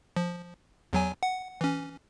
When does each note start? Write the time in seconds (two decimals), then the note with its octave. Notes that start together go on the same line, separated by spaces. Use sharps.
0.16 F3
0.93 E2 F#3 G#5
1.23 F#5
1.61 E3 C#4